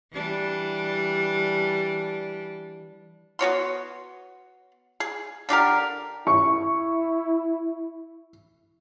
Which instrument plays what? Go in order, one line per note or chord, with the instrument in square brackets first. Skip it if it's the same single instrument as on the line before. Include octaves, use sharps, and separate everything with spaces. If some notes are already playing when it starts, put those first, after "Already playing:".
[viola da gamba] E3 G3 D4
[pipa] B3 F#4 C#5 C6
G#4
D3 D4 G4 A#4
[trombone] E4 [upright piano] C#6